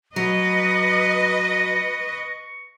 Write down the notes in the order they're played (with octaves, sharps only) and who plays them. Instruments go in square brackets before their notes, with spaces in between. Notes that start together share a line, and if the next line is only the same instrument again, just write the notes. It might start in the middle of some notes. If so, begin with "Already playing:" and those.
[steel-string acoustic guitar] F#3 [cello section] B4 D#5 [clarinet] C#6 [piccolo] A#6